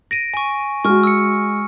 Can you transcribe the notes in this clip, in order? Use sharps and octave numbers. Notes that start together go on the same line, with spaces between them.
A#6 D7 D#7
G#5 C#6
G#3 F#4 C#6 F6
E6 C#7